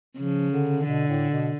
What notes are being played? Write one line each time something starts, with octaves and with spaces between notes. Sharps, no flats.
C#3 F3
D3
B2 D3
A2
B2